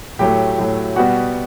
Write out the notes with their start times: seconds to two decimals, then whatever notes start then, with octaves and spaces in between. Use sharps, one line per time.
0.19 A2 F#3 A3 G4 G5
0.58 A2 F#3 A3
0.96 B2 G3 B3 F#4 F#5